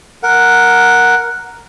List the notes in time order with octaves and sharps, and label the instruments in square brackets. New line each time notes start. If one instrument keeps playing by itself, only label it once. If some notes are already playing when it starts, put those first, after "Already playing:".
[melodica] A#4 F#5